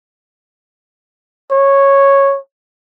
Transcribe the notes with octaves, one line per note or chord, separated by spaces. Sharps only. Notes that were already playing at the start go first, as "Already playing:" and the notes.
C#5